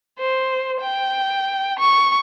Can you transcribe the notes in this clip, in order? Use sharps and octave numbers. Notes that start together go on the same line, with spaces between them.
C5
G5
C#6